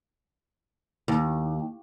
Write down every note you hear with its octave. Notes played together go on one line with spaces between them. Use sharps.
D#2